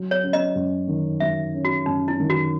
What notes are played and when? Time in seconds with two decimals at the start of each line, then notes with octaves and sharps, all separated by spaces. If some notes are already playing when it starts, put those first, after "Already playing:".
Already playing: F#3
0.11 C#5
0.23 C#4
0.33 D#5
0.55 F#2
0.88 D#3
1.20 F#3 E5
1.54 C#4
1.65 F#4
1.86 F#2 D#4
2.08 E4
2.19 D#3
2.30 F#4